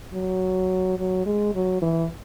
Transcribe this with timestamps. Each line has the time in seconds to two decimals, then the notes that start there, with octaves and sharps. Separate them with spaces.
0.13 F#3
0.99 F#3
1.26 G#3
1.55 F#3
1.82 E3